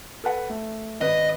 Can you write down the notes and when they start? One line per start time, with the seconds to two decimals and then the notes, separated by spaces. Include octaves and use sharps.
0.24 A4 B4 F#5
0.50 A3
1.01 G#1 B4 D#5